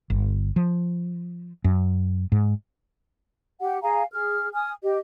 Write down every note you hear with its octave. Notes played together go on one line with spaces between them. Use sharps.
G1
F3
F#2
G#2
G4 F#5
G#4 F5 G#5 A#5
G#4 F6
G#5 D#6 F6
G4 D#5